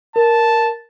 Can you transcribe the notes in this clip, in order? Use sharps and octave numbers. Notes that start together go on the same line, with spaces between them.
A#4 A5